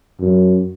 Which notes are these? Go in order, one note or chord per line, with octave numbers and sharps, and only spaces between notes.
F#2